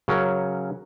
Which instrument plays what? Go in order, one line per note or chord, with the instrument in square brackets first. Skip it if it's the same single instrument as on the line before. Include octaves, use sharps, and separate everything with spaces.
[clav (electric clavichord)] C#3 F#3 C#4 A#4